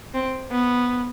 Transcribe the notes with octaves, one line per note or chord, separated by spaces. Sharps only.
C4
B3